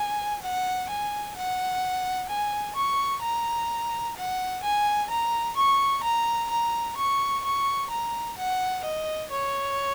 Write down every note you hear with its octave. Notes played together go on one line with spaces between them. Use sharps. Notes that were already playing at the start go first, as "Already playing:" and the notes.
Already playing: G#5
F#5
G#5
F#5
G#5
C#6
A#5
F#5
G#5
A#5
C#6
A#5
A#5
C#6
C#6
A#5
F#5
D#5
C#5